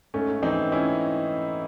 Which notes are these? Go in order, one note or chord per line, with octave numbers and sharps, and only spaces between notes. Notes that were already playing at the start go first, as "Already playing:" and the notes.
G#2 A3 C#4
E3 C4 D#4
C#4 E4